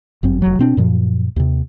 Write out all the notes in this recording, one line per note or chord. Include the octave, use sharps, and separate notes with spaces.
G1 F#2 C4
F1 F#3
B2 C4 D4
F#2 A#2 F3
D#2 C3